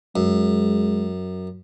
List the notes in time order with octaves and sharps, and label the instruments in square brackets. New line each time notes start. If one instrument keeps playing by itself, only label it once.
[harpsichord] F#2 [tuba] G#3